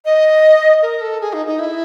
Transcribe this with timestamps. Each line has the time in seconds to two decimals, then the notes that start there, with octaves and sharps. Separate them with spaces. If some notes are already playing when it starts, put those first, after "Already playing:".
0.05 D#5
0.82 A#4
1.01 A4
1.21 G#4
1.33 D#4
1.47 D#4
1.59 E4